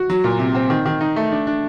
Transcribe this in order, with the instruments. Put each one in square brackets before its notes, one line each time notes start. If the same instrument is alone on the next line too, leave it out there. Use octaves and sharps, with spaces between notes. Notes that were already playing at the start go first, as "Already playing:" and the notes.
Already playing: [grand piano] F#4
F#3
A#2
C3
C4
D#3
D#3
D#4
A3
D4
D4